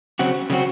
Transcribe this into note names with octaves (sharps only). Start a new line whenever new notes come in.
C#3 F#3 C4 F#4
C#3 F#3 C4 F#4